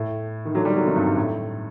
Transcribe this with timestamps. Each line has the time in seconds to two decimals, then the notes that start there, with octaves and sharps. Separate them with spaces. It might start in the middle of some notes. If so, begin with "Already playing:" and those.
Already playing: A2
0.45 D#3
0.55 D3 F#3
0.65 D#3 G3
0.75 D3 F#3
0.86 C3 D#3
0.96 G2
1.07 G2
1.17 A2